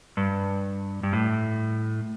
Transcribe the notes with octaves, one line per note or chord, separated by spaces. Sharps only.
G2
G2
A2